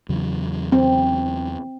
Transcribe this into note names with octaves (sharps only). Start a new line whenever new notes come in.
E2 C#3 F#3
C4